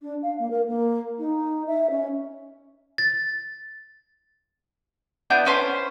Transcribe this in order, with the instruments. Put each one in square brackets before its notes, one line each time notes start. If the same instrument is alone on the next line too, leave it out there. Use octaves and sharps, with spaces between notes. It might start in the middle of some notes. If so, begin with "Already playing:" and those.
[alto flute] D4
F5
A#3
A#4
A#3
D#4
E5
C#4
[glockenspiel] A6
[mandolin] B3 D4 E4 G6
C#4 B4 C5 C6